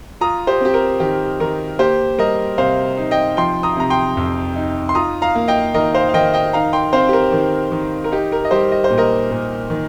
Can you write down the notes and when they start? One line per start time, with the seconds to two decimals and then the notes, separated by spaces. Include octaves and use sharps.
0.21 F4 A#5 D#6
0.47 G4 C5
0.61 C4 G4
0.74 A#4
1.00 D#3 G4
1.40 D#3 A#4
1.79 A#3 G4 C5
2.18 G3 A#4 D#5
2.58 C3 C5 F5
2.97 D#4
3.11 D#5 G5
3.37 F3 G5 C6
3.63 A#5 D#6
3.77 C3 A#5
3.90 G5 C6
4.17 F2
4.56 D#4
4.89 C6
4.95 F4 A#5 D#6
5.22 F5 A#5
5.35 A#3
5.48 D#5 G5
5.74 D#3 A#4 D#5
5.94 C5 F5
6.09 F5
6.14 D#3 D#5 G5
6.34 D#5 G5
6.53 D#4 F5 A#5
6.73 G5 C6
6.93 C4 C5 F5
7.09 G4
7.13 A#4
7.32 D#3
7.72 D#3
8.04 A#4
8.12 D#4 G4
8.32 A#4
8.45 D#5
8.51 G3 G4 C5
8.72 D#5
8.84 C5
8.90 A#2
8.98 A#4 D#5
9.31 A#2
9.70 D#3